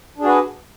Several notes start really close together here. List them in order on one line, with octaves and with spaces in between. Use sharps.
D4 G#4 F#4 B4